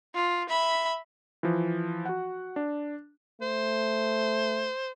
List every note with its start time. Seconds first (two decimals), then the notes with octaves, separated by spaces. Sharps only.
0.15 F4
0.49 E5 B5
1.43 E3 F3
2.06 F#4 F#5
2.56 D4
3.41 A3 C5